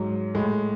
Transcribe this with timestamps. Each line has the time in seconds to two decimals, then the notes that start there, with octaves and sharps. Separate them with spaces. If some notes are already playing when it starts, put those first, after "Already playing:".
Already playing: G#2 F#3
0.35 A2 G#3